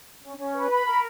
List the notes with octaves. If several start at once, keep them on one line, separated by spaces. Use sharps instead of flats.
C#4
C#4
B4
B5
A#4